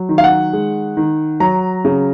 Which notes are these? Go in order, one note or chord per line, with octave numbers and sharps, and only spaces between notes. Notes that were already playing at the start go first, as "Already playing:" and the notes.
Already playing: F#3
D#3
F5
F#5
G#3
D#3
F#3 A#5
C#3